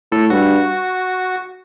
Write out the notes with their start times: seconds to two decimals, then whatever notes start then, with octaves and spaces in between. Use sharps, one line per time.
0.12 A2 A4
0.30 G2 F#4